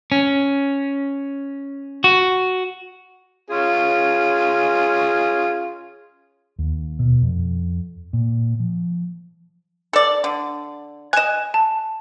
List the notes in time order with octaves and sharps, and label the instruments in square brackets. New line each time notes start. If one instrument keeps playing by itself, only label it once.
[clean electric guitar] C#4
F#4
[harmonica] C#4 F4 G#4
[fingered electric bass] D#2
B2
F2
A#2
F3
[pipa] A4 D5
D3
[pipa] D#5 G#5 [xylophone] F#6 E7
[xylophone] A5